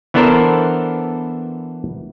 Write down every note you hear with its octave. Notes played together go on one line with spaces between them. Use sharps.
E3 B3 D4 A4 A#4 C5